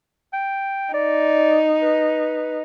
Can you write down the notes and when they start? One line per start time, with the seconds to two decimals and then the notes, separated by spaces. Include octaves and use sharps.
0.33 G5
0.94 D#4 D5
1.82 B4